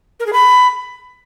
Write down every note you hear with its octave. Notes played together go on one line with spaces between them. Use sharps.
A#4
G#4
B5